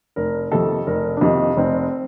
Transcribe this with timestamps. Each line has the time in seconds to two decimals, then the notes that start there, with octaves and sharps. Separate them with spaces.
0.16 F1 A#4
0.52 F2 C3 D#3 A4
0.87 F1 A#4
1.17 D4
1.21 F2 C3 D#3 D#4
1.57 F1 C4